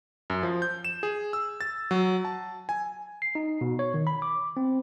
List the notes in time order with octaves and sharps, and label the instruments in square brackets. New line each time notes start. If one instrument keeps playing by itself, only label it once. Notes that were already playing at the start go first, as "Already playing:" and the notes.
[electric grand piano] F#2
F3
G6
E7
G#4
E6
A6
F#3
A5
G#5
[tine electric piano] C7
D#4
B2
C#5
D#3
B5
D6
C4